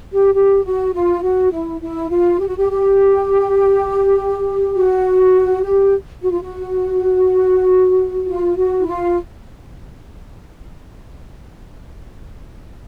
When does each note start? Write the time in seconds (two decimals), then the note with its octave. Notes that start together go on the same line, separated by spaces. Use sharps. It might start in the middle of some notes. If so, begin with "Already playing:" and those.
0.13 G4
0.34 G4
0.64 F#4
0.93 F4
1.22 F#4
1.52 E4
1.81 E4
2.10 F4
2.40 G4
2.48 F#4
2.57 G4
2.69 G4
4.75 F#4
5.63 G4
6.22 F#4
6.31 F4
6.41 F#4
8.28 F4
8.56 F#4
8.79 E4
8.86 F4